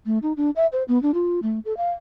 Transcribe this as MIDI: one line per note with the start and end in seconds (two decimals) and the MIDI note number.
0.06 0.19 57
0.23 0.33 63
0.37 0.50 62
0.56 0.67 76
0.73 0.83 72
0.88 1.01 59
1.03 1.11 62
1.14 1.40 65
1.43 1.59 57
1.65 1.76 69
1.77 1.92 77